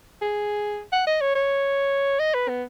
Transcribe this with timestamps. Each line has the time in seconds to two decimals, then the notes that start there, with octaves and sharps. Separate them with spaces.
0.22 G#4
0.92 F#5
1.07 D#5
1.21 C#5
1.35 C#5
2.19 D#5
2.34 B4
2.48 B3